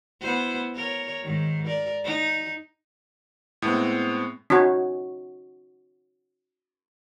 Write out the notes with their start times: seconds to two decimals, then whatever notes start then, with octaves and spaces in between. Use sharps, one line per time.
0.21 B3 E4 C5
0.75 A#4 C#5
1.23 G#2 D#3
1.66 A#4 D5
2.05 D#4
3.62 A2 G#3 B3 C4
4.50 C#4 D#4 F#4 C#5